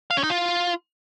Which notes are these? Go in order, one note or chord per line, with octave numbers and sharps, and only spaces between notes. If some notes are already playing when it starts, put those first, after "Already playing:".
F5
C#4
D#4
F4